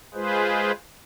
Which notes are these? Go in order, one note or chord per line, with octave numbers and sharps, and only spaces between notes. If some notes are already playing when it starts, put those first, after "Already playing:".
G#3 F4 G#4 B4 C5